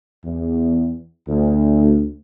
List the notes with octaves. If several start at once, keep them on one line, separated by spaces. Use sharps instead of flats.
E2
D2